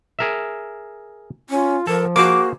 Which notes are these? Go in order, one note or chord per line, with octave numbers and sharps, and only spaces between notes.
G#4 A#4 E5
C#4 F4
F3 A4 A#4
A#3 F#4 G#4 C5 D6